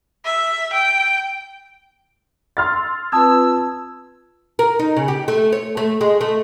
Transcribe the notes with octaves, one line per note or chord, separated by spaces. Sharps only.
E5
G5
C6 E6 F6 A6
C4 F4 B4 A5 D#6 E6 G#6
A#4
D#4
C#3
G4
A3
C#5
A3
G#3
A3